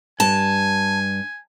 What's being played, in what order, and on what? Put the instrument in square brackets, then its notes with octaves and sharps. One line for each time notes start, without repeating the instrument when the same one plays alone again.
[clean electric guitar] G2 [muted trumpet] G#5 [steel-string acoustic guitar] A5